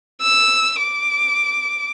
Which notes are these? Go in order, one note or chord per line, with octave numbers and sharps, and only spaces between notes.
E6
D6